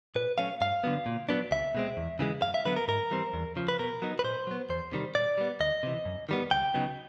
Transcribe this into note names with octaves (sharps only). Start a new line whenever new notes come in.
A#2 B4
F#3 A3 C#4 F5
G2 F5
D3 F#3 B3
A#2
F#3 B3 D4
C#2 E5
B2 G#3 C4
E2
C#3 E3 G#3
F#2 F5
E5
D3 F#3 B3 B4
A#4
G#2 A#4
E3 G3 C4
E2
C#3 F3
B4
B2 A#4
F#3 B3 D#4
B4
A#2 C5
F#3 B3
E2 C5
C3 D#3 G3
A#2 D5
G3 B3
D2 D#5
C3 E3
F#2
D#3 G3 B3
C#2 G5
C#3 F#3 B3 D#4